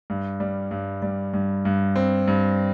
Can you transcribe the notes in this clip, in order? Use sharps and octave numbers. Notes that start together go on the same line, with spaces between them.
G2
G3
G2
G3
G2
G2
C4
G2